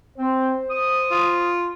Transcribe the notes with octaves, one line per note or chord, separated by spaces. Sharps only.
C4 C5
D#6
F4